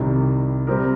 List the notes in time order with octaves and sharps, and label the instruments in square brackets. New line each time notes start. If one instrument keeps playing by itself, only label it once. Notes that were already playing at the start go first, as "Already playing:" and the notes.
Already playing: [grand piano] C2 C3 D#3 G3
C3 G3 C4 G4 A#4